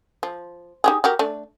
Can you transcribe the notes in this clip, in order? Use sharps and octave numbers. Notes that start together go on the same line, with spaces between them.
F3
D#4 G4 G#4
F#4 G4 A#4
A3 D4